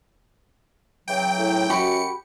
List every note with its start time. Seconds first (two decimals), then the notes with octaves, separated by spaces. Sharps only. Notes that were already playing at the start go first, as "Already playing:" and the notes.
1.08 C#3 E3 F#3 G5
1.38 A2
1.70 F#2 F#4 G4 B5 C#7